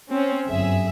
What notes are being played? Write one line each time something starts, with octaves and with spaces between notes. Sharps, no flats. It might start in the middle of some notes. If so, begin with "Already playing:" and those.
C4 C#4
G1 F#2 G#4 E5